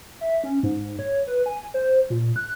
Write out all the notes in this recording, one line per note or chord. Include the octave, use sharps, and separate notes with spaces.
E5
C#4
G#2
C#5
B4
G#5
C5
A#2
F#6